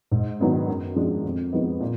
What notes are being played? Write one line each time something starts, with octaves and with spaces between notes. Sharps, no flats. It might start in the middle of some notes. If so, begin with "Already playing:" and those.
G#2
D#3 F#3 B3 D4
F#2
F3 G#3 D4
F2
F3 G#3 B3 D#4
A#2